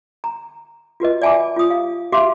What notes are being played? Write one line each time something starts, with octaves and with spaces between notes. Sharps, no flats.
A#5
F4 F#4 B4 D#5
D5 E5 G#5 A5 B5 D6
F4 D#6
G4 F5
F#4 G4 E5 F5 C6 D6